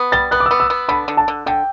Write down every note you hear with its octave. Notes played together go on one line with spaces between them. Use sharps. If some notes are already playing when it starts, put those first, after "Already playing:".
Already playing: B3
G3 A6
B3 F#6
D6
E6
B3
E6
B3
D3 B5
D3
A5
D3
D3 G5